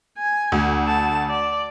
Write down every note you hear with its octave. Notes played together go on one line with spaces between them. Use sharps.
G#5
D2
A5
D5